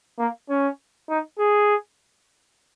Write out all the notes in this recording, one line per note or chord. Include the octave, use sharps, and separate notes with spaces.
A#3
C#4
D#4
G#4